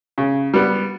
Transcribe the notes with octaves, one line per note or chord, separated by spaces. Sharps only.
C#3
G3 B3